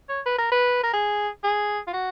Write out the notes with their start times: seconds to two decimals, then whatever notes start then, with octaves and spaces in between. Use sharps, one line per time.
0.09 C#5
0.26 B4
0.38 A#4
0.52 B4
0.83 A#4
0.93 G#4
1.44 G#4
1.87 F4
1.93 F#4